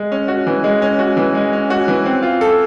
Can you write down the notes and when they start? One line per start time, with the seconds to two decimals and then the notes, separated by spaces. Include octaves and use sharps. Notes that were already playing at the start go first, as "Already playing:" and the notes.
Already playing: G#3
0.12 C#4
0.28 F#4
0.47 E3
0.64 G#3
0.82 C#4
0.99 F#4
1.17 E3
1.35 G#3
1.53 C#4
1.70 F#4
1.88 E3
2.05 C4
2.23 F4
2.41 A4